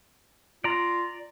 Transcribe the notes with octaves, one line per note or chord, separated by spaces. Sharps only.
F4 D5 A#5